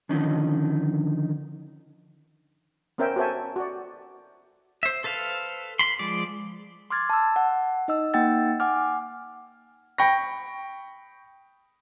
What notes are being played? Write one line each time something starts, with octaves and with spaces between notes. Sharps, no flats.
D3 D#3 F3 C#4 D#4
B3 C#4 A#4 C5 E5 G5
F#4 A4 C5 E5 G#5
F#4 D5
C5 E5
A4 B4 C5 F5
B5 C6
F3 G#3 D5
C6 D6 F6 G#6 A6
A5 E6
F#5
D#4 D#5 E6
A#3 D#4 F#5 G5 E6 A6
F#5 G#5 D6 F6
G5 B5 C#6 A#6